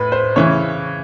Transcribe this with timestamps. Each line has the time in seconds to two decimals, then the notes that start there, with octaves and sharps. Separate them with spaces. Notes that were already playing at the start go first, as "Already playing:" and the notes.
Already playing: A2 B4
0.12 C5
0.36 C#3 E3 C#5